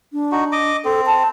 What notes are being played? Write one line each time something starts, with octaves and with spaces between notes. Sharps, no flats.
D4
D#4 F#4
D#5 D6
C4 A4
A5